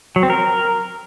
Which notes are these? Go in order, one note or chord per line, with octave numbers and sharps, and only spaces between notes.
F#3
C4
A#4